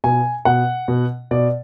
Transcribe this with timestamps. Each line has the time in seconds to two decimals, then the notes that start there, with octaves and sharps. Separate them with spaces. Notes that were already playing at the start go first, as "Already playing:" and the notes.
0.04 B2 G#5
0.45 B2 F#5
0.88 B2
1.31 B2 D5